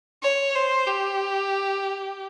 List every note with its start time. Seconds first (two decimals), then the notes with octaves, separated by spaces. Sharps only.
0.23 C#5
0.55 C5
0.87 G4